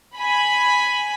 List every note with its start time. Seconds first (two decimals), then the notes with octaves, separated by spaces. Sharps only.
0.17 G#5 B5